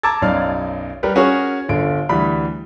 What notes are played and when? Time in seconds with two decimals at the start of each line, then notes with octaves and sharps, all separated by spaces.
0.03 A5 A#5 D6 E6 G#6 A6
0.22 B1 F#2 D#4 D5 F5 F6
1.03 G3 G4 A#4 B4
1.16 C#4 F#4 G#4 A#4 C#5
1.69 G1 D3 F4 D7
2.09 D2 E3 G3 B5